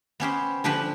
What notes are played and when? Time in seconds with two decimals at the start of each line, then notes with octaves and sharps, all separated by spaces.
0.20 B3 C#4 G4 C5
0.64 D3 F3 D4 G4 B4